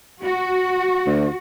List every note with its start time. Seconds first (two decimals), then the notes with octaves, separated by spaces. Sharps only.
0.23 F#4
1.06 D2